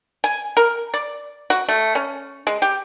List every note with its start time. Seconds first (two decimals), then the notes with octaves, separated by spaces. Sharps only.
0.24 G#5
0.57 A#4
0.94 D5
1.50 F#4
1.69 A3
1.95 C#4
2.47 G#3
2.62 G4